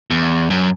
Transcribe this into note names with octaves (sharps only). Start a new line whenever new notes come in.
E2
F#2